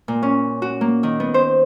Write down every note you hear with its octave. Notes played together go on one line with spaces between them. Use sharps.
A#2
C#4
F#4
A#3
D#3
B3
C5